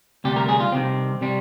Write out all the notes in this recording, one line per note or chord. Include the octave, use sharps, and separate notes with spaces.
D2 C3 G3 G4
A#4
G#4
F4
C2 C3 D#3 C4
C3 G3